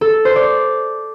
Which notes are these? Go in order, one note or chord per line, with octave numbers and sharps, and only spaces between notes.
A4
C5
D5